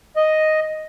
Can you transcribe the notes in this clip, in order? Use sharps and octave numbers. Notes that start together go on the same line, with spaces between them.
D#5